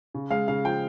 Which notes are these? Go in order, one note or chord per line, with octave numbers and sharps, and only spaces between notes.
C#3
G#3 F5
C#3 F5
F3 G5